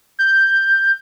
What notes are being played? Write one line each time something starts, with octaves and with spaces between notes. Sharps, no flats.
G6